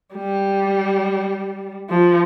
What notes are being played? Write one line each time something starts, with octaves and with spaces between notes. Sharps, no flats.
G3
F3